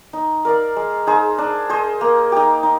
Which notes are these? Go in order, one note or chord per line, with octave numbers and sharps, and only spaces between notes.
D#4
A#4 D5 F5
G#3
D#4 G#4 C5
D4
G#4 C5 D#5
A#3
D#4 G4
D#4